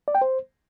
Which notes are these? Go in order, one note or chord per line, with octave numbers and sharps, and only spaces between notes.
D5
G5
C5